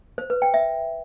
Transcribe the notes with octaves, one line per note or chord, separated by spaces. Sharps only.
C5
B4
G5
E5